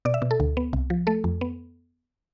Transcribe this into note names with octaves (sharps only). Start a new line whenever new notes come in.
B2 D5
E5
B2
A4
D2
B3
C2
F3
A3 A4
F2
B3